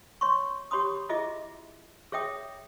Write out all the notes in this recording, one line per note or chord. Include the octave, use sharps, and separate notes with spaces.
C#5 C6 C#6
G4 C#5 B5 C6 D#6
E4 F4 G#4 D#5 E5 D6
G#4 C#5 E5 G5 D#6